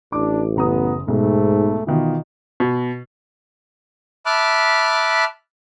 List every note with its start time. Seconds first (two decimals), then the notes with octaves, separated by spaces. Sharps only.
0.12 A1 D4 D6
0.56 F#1 B3 A#5 D#6
1.08 B1 G#2 A3
1.87 B2 D#3 E3 F4
2.60 B2
4.26 E5 A5 B5 D6 F6 F#6